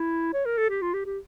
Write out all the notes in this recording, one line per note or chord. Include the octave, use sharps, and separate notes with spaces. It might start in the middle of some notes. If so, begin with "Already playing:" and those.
Already playing: E4
C#5
A#4
A4
G4
F4
G4
G4